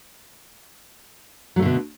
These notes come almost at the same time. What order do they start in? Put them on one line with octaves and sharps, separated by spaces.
F#3 A3 D3 B2